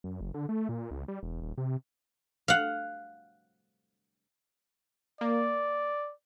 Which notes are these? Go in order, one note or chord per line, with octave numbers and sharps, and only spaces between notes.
F#2
F#1
D3
A3
A#2
C#2
G3
E1
D#1
C3
F5 F#5
A#3 D5